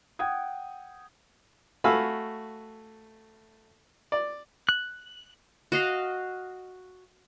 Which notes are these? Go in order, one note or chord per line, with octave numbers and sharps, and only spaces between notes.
F#5 G5 D#6 G#6
A3 F#4 F5 G#5 B5 E6
D5
F#6
F#4 D#5 F5